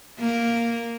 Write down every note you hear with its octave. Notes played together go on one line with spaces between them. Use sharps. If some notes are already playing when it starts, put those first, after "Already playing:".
A#3